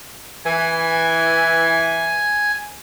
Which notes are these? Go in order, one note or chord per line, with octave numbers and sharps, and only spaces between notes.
E3 G#5